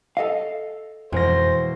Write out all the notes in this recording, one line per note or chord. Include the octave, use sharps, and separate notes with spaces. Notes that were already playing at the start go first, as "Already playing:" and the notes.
A4 D#5 F5
E1 F2 C5 A#6